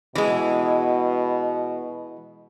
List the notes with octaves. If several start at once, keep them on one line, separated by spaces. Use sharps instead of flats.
B2 E3 G#3